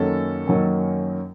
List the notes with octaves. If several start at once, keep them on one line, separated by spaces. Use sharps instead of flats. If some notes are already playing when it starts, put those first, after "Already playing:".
Already playing: F#2 D#3 F#3 A#3 C#4 A4
F#2 D#3 F#3 A#3 C#4